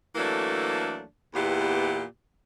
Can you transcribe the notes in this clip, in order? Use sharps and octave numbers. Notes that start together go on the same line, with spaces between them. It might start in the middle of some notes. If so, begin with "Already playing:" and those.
E3 F#3 A3 A#3 D4 A4
E2 A#2 B3 E4 G4